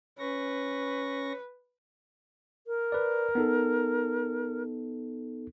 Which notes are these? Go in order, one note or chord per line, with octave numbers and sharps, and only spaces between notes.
C#4 B4 C#6 A#6
A#4
B4 D5
B3 D#4 A4